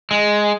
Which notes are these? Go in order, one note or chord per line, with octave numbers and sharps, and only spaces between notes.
G#3